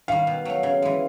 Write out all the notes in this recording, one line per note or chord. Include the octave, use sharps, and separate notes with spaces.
D#3 G3 F5
B2
F#3 A3
C#3
E3 G#3